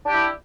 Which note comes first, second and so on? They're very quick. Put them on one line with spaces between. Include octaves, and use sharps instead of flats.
D4 G4 E4